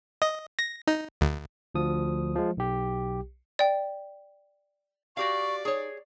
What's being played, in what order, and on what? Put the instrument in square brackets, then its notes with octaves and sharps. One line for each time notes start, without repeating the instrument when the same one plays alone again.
[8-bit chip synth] D#5
A#6
D#4
D2
[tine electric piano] D2 F3 D#6
F3 G#3
B1 G4
[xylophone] D5 G5
[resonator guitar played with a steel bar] F#4 G4 F5 [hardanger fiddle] D5 [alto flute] C#6
[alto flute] D#4 [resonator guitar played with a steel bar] G#4 C#5